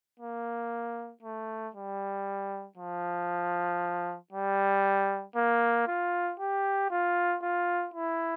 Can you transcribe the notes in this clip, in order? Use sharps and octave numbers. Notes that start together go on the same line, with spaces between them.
A#3
A3
G3
F3
G3
A#3
F4
G4
F4
F4
E4